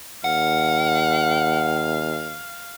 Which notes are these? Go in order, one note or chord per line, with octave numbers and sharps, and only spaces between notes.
D#2 F5 F#5